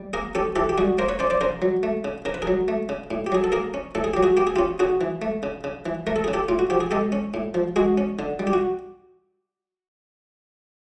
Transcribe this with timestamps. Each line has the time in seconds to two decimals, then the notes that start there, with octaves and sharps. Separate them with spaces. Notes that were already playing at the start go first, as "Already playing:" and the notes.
Already playing: G3
0.13 A#3 G#4 A#4
0.35 C#4 G4 A4
0.56 E3 G4 A4
0.69 G4
0.78 G3 F#4 G#4
0.98 A#3 A#4 C5
1.09 B4 C#5
1.19 C#4 C5 D5
1.30 C5 D5
1.41 C#3 A#4 C5
1.62 F#3
1.83 A3
2.04 C#3
2.25 C#3 A#4
2.34 B4
2.42 G#4 A#4
2.47 F#3
2.68 A3
2.89 C#3
3.11 A2
3.27 G4
3.32 F#3 G#4
3.44 A4
3.52 A#3 G#4 A#4
3.74 C#4
3.95 A2 A4
4.04 G#4
4.14 F#3 G4
4.23 F#4 G#4
4.37 A#3 G4
4.47 G#4
4.56 C#4 F4 G4
4.79 C#3 F#4 G#4
5.01 E3
5.22 A3
5.43 C#3
5.64 C#3
5.86 E3
6.07 A3 A#4
6.16 A4
6.24 C#3 G#4
6.33 G4 A4
6.49 A2 F4
6.59 F#4
6.70 F3 G4
6.80 G#4
6.91 G#3 G4 A4
7.12 C#4
7.34 A2
7.54 F3
7.76 G#3 F#4 G#4
7.98 C#4
8.19 D3
8.39 G3
8.47 G4
8.53 F#4